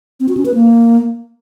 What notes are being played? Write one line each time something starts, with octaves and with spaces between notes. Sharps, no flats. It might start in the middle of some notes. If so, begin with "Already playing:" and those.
C4
F#4
C#4
B4
A#3